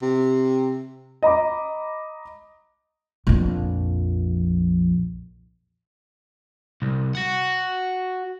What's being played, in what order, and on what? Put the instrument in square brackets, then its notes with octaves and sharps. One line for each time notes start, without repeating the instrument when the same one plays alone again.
[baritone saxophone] C3
[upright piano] D#5 A#5 B5 D6
[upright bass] A#1 F2
[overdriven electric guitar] C2
F#4 F#5